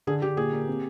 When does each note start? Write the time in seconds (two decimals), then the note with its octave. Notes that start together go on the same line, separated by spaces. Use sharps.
0.07 D3 G#4
0.22 D3 G4
0.37 A#2 G#4
0.52 A#3
0.68 C4